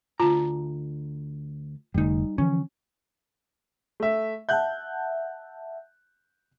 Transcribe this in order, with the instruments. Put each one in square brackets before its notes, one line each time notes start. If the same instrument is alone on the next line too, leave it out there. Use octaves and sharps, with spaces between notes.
[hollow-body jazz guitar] D2 A5 A#5 [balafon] F4
[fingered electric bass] F1 D3 A3 [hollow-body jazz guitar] G3 D#4
[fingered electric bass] D3 E3 F3 [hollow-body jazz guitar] C#4
[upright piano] A3 E5
[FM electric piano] E5 F#5 A5 [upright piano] F#6 G6